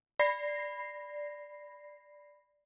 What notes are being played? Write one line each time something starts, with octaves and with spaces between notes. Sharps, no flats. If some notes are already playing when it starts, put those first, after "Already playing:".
D5 B5 A#6 C7